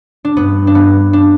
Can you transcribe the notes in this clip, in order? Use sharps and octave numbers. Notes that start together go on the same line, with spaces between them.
D4
G2 B3
D4
B3
D4